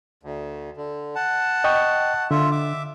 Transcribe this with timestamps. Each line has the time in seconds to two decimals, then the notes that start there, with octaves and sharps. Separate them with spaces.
0.23 D2
0.77 D3
1.15 F#5 A5
1.64 D#5 G5 C#6
2.31 D3 F4 E5
2.51 E5 D6